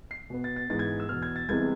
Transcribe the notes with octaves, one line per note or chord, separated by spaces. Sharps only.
C7
B2 B3
A6
A6
G#2 E3 B3 A6
G#6
E6
E2 B2 B3 F6
G#6
A6
C2 C3 E3 G#3 B3 G#6